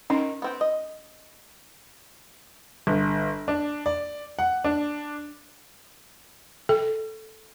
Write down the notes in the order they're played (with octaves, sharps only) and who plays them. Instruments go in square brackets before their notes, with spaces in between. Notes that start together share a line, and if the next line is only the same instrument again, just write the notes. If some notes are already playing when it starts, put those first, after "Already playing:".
[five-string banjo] D#3 [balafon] C#4 D#4
[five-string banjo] B3 C4 G5
D#5
[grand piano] G1
D4
D5
F#5
D4
[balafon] A4